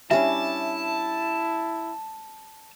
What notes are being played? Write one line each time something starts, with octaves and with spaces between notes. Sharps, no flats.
G3 C#4 D4 E4 E5 A5